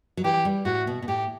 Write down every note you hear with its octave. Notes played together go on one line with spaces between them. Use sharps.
F#3
E3 G4
G3
A2 F#4
B2
B2
A2 G4